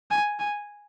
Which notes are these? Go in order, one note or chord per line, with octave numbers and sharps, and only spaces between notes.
G#5
G#5